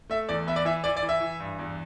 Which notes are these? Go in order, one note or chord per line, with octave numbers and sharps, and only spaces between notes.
A3 E5
E2 D5
B3 E5
D5
E3 E5
E3 D5
D5
E3
E5
E3
G2
E2